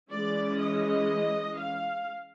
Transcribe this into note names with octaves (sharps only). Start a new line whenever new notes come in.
E3 G#3 C#4 D5
D#5
F5